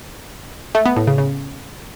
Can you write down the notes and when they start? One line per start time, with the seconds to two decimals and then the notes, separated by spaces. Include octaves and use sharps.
0.75 A3
0.86 B3
0.96 A2
1.07 C#3
1.18 C#3